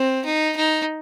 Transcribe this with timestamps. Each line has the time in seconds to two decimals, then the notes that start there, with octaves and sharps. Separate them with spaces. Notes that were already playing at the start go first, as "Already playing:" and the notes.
Already playing: C4
0.25 D#4
0.56 D#4